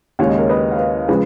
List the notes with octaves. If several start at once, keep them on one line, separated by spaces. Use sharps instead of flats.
D#2 C#3 G#3 C#5
D#5
A#4 C#5
B4 D#5
F5
B4 D#5
C#3 F3 G#3 G#4 B4